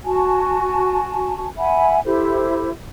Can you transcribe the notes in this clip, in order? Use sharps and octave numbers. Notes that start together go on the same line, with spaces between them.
F#4 G#5 A5
E5 F#5 G#5 B5
E4 G4 A4 C5